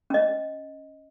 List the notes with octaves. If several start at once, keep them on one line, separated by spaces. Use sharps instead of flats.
C#4 D#5